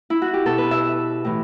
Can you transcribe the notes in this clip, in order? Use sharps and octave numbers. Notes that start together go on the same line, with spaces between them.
E4
F#4
G4
B2 A4
B4
E5
A2 E3